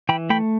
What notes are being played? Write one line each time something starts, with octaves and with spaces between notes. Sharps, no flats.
E3 G5 B5
A3 G5 B5